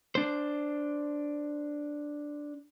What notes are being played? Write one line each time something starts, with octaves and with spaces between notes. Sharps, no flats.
D4 C5